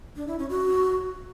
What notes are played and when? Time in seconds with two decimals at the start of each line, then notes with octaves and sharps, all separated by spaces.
0.16 D4
0.28 E4
0.39 C#4
0.50 F#4